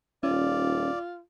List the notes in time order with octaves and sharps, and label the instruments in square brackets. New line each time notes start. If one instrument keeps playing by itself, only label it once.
[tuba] D#1 [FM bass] C#4 [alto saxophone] F4 [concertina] D5